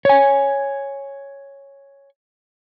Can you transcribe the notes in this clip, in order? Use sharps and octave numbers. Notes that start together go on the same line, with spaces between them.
C#5 G#5